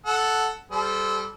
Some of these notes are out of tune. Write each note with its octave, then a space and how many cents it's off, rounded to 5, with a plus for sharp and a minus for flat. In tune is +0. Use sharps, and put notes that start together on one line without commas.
A4 -5 F#5 +0
G3 +0 A4 -25 C5 -30